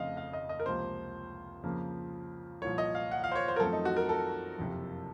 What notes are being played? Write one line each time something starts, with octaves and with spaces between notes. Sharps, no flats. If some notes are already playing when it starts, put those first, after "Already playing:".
Already playing: F1 F2 C#3 A3 C4 D#5 F5
F5
D#5
D#5
A#4
C#2 C3 F3 A#3 C5
F2 C#3 F3 A#3
C2 A#2 F3 C#5
D#5
F5
F#5
F5
C5
C#5
C5
A#4
F#2 F3 A3 C4 A4
D#4
F#4
A#4
A4
F#1 F2 C3